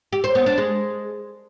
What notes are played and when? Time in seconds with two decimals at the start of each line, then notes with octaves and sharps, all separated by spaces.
0.13 G4
0.24 C5
0.35 B3
0.46 D4
0.58 G#3